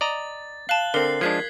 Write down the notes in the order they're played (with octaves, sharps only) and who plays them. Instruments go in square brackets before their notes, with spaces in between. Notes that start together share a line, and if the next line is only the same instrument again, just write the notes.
[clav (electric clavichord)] D5 D#5 A#5 [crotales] A6
[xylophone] F5 A5 [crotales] F#6 F#7 G7
[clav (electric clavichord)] D3 C4 [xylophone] A#4 [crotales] C7
[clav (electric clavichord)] F3 G#3 D4 [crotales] G#6 B6